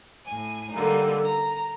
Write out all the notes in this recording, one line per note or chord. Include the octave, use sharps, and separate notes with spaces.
A2 G#5
D3 G3 A#3 D#4
A#5